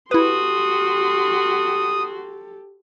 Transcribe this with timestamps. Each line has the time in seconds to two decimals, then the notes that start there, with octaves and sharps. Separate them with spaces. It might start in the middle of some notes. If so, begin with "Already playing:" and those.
0.11 E4 F#4 G4 A4 B4 C6 D#6